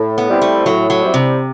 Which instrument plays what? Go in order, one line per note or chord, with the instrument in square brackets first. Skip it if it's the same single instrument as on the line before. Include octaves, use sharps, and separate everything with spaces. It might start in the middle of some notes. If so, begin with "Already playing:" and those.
Already playing: [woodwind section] A2
[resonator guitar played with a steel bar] B3
[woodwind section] G3 C4 E4
[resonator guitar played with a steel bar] A3
[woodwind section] A2 [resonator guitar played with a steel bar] F#3
[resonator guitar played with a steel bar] F#3
[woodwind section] G3 C4 E4
[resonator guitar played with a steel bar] C3